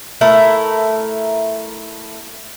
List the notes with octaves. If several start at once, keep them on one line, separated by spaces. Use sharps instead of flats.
A3 E4 A#4